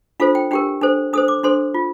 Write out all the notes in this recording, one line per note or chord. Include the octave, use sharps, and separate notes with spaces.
D4 F4 A4 C5 F5
G5
D4 G4 A#4 G5
D4 A4 C5
D4 A4 C5 D#6
D6
D4 A4 C5 C6
F4